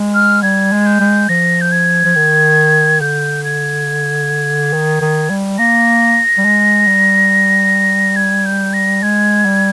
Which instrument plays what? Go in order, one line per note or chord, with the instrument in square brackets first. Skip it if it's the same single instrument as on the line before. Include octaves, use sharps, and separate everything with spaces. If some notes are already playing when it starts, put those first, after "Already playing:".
Already playing: [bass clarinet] G#3
[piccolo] F6
[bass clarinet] G3 [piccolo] G#6
[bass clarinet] G#3
[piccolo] G6
[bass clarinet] G#3
[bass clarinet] F3 [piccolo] A#6
[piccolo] G6
G#6
[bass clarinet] F3
D#3
[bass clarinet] D3 [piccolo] G6
[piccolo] G#6
[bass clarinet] D#3
D#3
G3
[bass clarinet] A#3 [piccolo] A#6
[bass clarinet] G3
G#3
G3
[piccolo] G#6
G6
A#6
[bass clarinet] G#3 [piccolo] G#6
[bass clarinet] G3